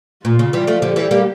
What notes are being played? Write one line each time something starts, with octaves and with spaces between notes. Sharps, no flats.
A#2 F4
C#3
E3 G3
F3 A3
D3 F3 G4
E3 G3
G3 A#3